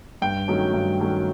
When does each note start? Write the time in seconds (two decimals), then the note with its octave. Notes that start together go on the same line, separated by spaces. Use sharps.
0.22 G2 G5
0.48 D#3 F#3 A3 C#4
0.74 G2
1.00 D#3 F#3 A3 C#4